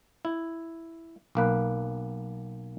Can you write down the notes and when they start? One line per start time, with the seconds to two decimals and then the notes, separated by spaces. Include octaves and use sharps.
0.25 E4
1.35 B1 A#3 B4